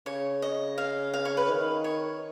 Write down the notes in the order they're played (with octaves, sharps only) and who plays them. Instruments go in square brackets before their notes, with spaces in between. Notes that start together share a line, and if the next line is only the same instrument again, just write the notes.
[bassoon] C#3 [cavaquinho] C#5
[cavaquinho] D#5
F5
F5
C#5
B4
[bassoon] D#3
[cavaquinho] C#5